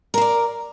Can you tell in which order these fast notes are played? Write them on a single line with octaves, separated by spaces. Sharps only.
A#4 C5 D5